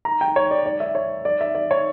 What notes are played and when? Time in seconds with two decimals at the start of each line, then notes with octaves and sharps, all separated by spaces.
0.05 A#5
0.21 G5
0.36 C#5
0.51 D5
0.66 D5
0.80 E5
0.95 C#5
1.25 D5
1.41 E5
1.55 D5
1.71 C#5